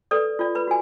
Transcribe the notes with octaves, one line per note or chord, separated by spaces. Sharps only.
A4 B4 D5 D#6
F4 D5
B4 B5
F#4 G#5